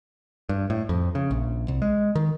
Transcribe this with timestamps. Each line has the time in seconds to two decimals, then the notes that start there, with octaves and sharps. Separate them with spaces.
0.49 G2
0.70 A2
0.89 F2
1.15 C#3
1.31 A#1
1.68 C2
1.82 G#3
2.15 D#3